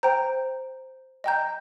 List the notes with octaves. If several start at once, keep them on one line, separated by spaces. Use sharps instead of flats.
C5 G5 A#5 G6
D#5 G5 A#5 G6